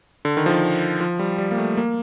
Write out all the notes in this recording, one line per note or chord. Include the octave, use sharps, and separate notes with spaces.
D3
D#3
F3
D#3
F3
G3
G3
A#3
A3
A#3